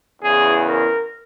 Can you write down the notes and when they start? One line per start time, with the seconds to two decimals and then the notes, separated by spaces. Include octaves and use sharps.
0.23 E2 C#3 E3 G#4
0.67 A#4